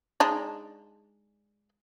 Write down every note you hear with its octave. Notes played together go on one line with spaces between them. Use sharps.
G#3 D4 D#4